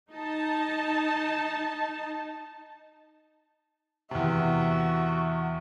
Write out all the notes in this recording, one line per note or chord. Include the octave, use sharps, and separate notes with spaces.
D#4 A5
E2 C3 F#4 E5